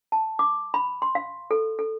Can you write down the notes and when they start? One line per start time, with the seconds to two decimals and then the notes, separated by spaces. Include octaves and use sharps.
0.12 A5
0.39 D6
0.74 B5
1.02 C6
1.15 F5
1.51 A4
1.79 A4